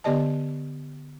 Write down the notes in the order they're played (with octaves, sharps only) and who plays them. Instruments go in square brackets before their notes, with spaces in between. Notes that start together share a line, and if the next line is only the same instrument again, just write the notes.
[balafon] D3 B3 G4 D5 D#5 A5